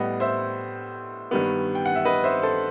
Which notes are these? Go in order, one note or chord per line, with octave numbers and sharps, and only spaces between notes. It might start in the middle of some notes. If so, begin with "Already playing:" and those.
Already playing: A2 G3 B3 D#5 F#5
C5 E5
G2 D#3 G3 B3
G5
F#5
E5
B4 D#5
C5 E5
A4 C5